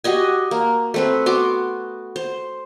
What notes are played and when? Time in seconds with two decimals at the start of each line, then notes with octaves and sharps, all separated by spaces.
0.04 F#4 G4 D#5 G#5
0.51 A#3
0.94 A3 C4 B4
1.26 B3 F#4 C6 D6
2.16 C5